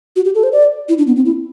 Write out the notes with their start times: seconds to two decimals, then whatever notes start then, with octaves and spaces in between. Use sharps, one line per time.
0.16 F#4
0.25 G4
0.35 A4
0.43 C5
0.52 D5
0.89 E4
0.98 D4
1.07 B3
1.16 C4
1.26 E4